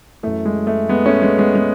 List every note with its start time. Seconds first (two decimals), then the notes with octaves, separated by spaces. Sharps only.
0.23 F#2 E3 A3
0.45 G#3
0.67 A3
0.89 G#3 B3
1.06 A3 C#4
1.22 G#3 B3
1.39 G#3 B3
1.55 G#3 B3